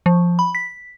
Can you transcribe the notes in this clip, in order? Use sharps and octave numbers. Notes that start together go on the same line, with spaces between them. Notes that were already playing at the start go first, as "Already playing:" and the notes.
F3
B5
B6